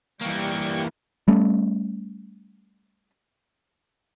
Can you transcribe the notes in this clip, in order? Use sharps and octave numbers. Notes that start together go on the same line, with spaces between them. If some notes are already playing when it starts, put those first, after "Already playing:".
E3 G3 A#3 G5 C#6
G3 A3 C#4